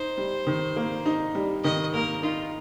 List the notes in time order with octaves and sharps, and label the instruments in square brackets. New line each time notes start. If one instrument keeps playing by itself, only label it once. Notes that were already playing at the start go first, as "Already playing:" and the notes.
Already playing: [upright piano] D#4 [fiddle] C5
[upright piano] G3
D#3
A#3
D#4
G3
[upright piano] D#3 [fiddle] D#5
[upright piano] A#3 [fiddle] A#4
[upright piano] D#4 [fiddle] F4